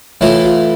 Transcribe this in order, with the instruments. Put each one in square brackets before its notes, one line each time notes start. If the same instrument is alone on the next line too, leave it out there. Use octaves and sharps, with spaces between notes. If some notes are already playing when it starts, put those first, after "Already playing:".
[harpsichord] A2 E3 A3 [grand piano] F4
[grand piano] F4